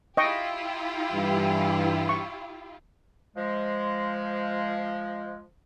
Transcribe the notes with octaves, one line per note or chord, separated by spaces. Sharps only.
E4 F4 G4 D#5 G5 C#6
G2 E3
C#6
F3 G#3